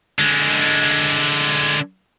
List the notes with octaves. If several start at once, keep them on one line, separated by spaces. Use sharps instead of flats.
D3 G#3